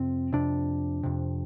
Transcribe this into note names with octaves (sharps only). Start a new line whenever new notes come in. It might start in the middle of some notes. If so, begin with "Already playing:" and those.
Already playing: F2 C3 C4
F2 C3 D4
F2 C3